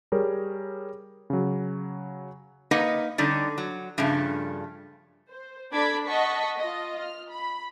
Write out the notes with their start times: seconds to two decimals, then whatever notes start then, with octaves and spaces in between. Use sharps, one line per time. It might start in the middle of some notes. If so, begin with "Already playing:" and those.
0.12 G3 G#4 A#4 C#5
1.30 C#3 F#3
2.71 A#3 D#4 A#4 B4 D#5 F#5
3.18 D3 G3 C#4 D#4 D5
3.58 F#3
3.98 G2 C#3 F3 A3
5.30 C5
5.72 D4 A4 B5 D6 G#6 B6
6.07 D#5 F#5 A5 C#6 B6
6.57 F4 D#5
6.99 F6
7.30 B5